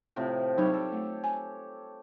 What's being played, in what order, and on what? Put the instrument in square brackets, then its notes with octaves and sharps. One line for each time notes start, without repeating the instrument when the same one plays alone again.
[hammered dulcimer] A2 C3 F3
[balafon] F#3 D#4 B5 [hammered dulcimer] G3 G4 C#5
[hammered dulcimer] A4
[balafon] A3
G#5